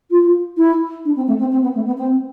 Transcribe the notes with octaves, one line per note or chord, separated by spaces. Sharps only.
F4
E4
D4
C4
A3
C4
C4
B3
A3
B3
C4